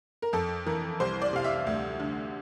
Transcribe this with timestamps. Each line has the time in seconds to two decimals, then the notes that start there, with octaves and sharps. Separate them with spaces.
0.22 A#4
0.33 F2 A4
0.66 E3 A#4
1.00 C2 C5
1.22 D5
1.33 C3 F5
1.44 E5
1.67 D2
2.00 D3